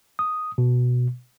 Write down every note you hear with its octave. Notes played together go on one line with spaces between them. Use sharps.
D#6
B2